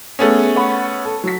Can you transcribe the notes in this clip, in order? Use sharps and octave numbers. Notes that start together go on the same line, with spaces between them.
A3 B3 C#4 G#4
C#5 F#5 B5
A4
F#3 B6